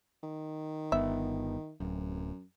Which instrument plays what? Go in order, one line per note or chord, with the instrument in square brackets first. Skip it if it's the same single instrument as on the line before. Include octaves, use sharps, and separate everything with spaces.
[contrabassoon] D#3
[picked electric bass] G1 B3 [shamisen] E5
[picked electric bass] D1 [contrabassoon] F#2